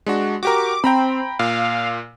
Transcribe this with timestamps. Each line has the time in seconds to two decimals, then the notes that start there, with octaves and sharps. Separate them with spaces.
0.06 G#3 D4 F#4
0.43 F#4 G4 A#4 D6
0.84 C4 G5 A#5 B5
1.39 A#2 F5